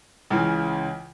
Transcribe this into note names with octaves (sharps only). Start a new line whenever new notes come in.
C#2 C#3 E3